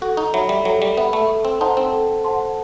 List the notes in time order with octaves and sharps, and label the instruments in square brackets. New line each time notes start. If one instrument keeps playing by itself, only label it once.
[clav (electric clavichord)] F#4 [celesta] A4
[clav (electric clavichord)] D#4
[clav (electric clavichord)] F#3 [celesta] E5 B5
[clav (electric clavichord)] G3
[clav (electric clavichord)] F#3 [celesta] A4
[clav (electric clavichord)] G3
[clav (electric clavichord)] B3 [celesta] E5 B5
[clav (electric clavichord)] A3
[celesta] A4
[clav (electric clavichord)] C4
[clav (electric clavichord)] D#4 [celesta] C5 F#5 A5 C6
[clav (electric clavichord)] C4
[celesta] A4
C5 F#5 A5 C6